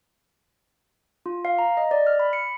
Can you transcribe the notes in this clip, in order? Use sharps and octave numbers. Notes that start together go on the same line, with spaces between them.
F4
F5
A#5
D#5
D5
F6
B5
C#7